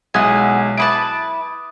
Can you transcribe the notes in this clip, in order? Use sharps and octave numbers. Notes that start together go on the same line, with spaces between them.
B1 G#3 E4 F#5 G#5 D#6
E4 B4 A5 D6 D#6 D7